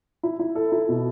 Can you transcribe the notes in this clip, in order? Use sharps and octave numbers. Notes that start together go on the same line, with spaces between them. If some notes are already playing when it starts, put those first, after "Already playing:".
E4
E4
A4
E4
B2